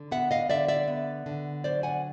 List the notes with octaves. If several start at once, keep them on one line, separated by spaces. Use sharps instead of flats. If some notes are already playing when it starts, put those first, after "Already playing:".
Already playing: D3
B3 E5 F#5
D#5 F5
D3 D5 E5
D5 E5
B3
D3
F#3 C5 D5
F#5 G#5